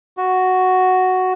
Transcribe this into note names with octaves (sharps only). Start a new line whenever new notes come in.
F#4